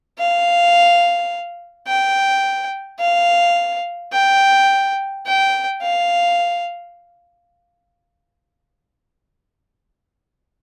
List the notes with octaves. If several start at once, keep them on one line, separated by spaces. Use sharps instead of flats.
F5
G5
F5
G5
G5
F5